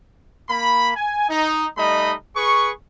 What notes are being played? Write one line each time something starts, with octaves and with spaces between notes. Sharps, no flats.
A#3 B5
G#5
D#4
G3 A3 D#4 D#5 B5
G#4 B4 C#6